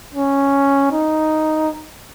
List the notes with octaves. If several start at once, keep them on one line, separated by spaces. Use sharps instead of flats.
C#4
D#4